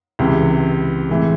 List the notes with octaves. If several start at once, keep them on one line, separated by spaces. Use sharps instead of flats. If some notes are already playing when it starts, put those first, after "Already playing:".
C#2 C3 E3
A2 E3 G#3